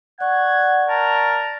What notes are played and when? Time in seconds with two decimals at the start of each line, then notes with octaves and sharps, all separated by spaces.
0.20 D5 F#5 C#6 G#6
0.89 A#4 A5